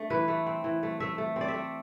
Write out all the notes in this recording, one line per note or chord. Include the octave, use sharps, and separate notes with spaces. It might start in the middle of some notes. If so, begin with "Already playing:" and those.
Already playing: A3 D4
E3 B4
A3
C4
E3
A3
A3 E5
A3
C4 D5
E5
A3